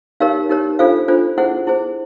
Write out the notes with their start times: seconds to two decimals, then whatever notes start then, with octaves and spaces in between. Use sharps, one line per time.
0.20 D#4 G4 A#4 C#5 F5
0.49 D#4 G4 A#4 C#5
0.79 D4 F4 A4 C5 F5
1.08 D4 F4 A4 C5
1.38 E4 G#4 C5 F#5
1.67 E4 G#4 C5